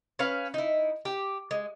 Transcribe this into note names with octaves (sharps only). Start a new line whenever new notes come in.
C#4 B4 F5
D#4 E4
G4
G#3